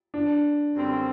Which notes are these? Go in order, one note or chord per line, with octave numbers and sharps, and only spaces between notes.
D4
F#2 D3 G3 C4